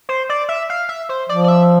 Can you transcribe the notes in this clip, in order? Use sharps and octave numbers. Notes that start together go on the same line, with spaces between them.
C5
D5
E5
F5
E5
C5
F3 D5
D5
E5